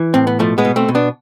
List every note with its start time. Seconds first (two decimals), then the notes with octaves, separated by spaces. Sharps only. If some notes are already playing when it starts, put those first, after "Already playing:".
Already playing: E3
0.14 A2 C4
0.27 B3
0.39 B2 F3 A3
0.58 G#3 B3
0.65 B2
0.76 A3 C4
0.88 B2
0.95 B3 D4